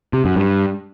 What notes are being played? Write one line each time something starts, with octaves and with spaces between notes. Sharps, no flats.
C3
F#2
G2